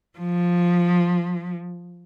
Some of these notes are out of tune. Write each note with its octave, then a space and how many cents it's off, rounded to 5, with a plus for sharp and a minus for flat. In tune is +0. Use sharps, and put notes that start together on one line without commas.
F3 +5